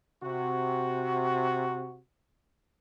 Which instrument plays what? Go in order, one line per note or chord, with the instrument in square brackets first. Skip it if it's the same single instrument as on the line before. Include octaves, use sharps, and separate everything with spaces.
[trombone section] C3 F#4